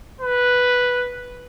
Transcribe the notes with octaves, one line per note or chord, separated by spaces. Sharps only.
B4